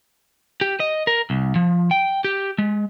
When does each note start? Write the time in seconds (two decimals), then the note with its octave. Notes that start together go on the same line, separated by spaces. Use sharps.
0.61 G4
0.80 D#5
1.07 A#4
1.30 C2
1.56 F3
1.91 G5
2.24 G4
2.58 G#3